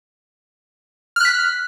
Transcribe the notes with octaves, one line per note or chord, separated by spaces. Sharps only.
F6 F#6 B6